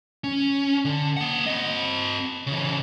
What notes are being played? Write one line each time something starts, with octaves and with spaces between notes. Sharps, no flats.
C#4
D3
A#3 F#5
C4 D#5
C#3 E3